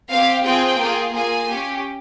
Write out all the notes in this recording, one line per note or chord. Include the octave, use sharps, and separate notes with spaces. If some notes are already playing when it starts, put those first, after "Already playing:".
C4 G4 F5
C4 F4 G#4 G5
A#3 F4 G#4
A#3 F4 G#4 G#5
C#4 G4